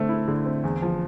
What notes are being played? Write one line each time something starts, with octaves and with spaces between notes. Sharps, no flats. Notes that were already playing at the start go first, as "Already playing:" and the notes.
Already playing: D3 A3 C4
E4
D3
C4
E2
F3